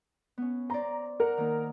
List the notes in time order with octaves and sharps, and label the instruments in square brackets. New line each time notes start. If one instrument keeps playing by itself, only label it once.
[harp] B3 C#4
[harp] C5 D5 [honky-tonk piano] A#5
[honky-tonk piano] A#4 [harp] F#5
[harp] D#3 A#3